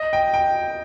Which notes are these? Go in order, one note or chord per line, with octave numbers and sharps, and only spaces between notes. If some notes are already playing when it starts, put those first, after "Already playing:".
Already playing: D#5
G5
G5